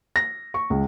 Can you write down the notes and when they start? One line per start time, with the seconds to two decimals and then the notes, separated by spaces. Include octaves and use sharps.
0.16 A#6
0.54 C#6
0.70 C#2